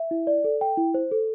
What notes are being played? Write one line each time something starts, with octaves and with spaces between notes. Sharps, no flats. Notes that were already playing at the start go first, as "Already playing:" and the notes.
Already playing: E5
E4
D5
A4
G5
E4
C5
A4